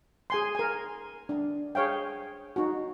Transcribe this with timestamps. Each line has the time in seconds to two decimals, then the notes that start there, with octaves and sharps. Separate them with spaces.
0.30 G#4 G#5 C6
0.55 A#4 G#5
1.29 D4
1.75 G#4 C#5 F5 G5
2.56 D#4 F#4